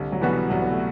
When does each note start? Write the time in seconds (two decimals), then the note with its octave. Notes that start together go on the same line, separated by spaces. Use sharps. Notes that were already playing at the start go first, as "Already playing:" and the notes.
Already playing: C2 D3
0.12 F#3
0.21 B2 E3 G3 B3 F#4
0.50 C2 F#3
0.62 B3
0.70 A3